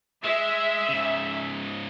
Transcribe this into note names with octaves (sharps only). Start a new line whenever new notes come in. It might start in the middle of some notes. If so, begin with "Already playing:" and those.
G#3 E5
G#2 C#3